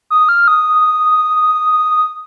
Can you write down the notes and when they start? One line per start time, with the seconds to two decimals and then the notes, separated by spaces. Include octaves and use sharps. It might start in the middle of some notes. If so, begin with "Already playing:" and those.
0.10 D#6
0.29 F6
0.48 D#6